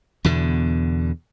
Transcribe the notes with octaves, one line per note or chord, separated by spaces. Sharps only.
E2 B2 D3